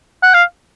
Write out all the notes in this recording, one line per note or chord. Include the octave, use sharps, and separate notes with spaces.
F#5
F5